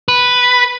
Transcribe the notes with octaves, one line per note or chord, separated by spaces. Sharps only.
B4